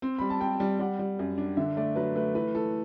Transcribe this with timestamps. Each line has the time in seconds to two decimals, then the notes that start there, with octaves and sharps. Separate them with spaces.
0.02 C4
0.19 G3 B5
0.30 A5
0.41 C4 G5
0.60 G3
0.79 G3 F#5
0.99 G3
1.19 F#2
1.38 D4
1.57 D3 E5
1.77 A3 D5
1.96 F#3 B4
2.16 A3 B4
2.35 E3 B4
2.55 E3 A4